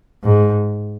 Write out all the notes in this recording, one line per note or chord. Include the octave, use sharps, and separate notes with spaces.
G#2